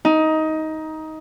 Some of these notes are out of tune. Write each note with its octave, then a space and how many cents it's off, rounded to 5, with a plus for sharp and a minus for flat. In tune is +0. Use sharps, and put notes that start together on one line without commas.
D#4 +15